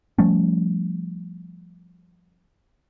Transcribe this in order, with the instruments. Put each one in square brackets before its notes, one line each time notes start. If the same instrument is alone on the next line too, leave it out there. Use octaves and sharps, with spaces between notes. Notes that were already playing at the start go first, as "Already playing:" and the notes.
[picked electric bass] F3 G3 A3 C#4